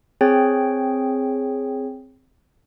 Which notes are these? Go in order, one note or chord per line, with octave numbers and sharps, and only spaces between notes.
C4 G#4 C#5 G5